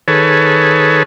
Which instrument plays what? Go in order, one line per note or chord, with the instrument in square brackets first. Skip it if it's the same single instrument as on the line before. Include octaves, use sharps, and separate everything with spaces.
[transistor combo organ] D#3 G#4 A4 B4 C#5